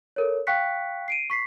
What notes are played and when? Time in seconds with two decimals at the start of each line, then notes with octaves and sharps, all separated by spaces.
0.16 A4 A#4 C#5
0.47 F5 G5 C#6 F#6 B6 C#7
1.08 C7 D7 D#7
1.30 C#6 B6 C7